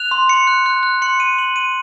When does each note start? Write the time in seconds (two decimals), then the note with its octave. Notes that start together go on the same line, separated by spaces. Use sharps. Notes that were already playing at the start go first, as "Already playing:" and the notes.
Already playing: F#6 F7
0.11 C6
0.29 C6 C#7
0.47 F#6
0.66 F#6
0.83 F#6
1.02 C6 C#7
1.20 C6 D#7
1.38 C6 F#7
1.56 C6 D#7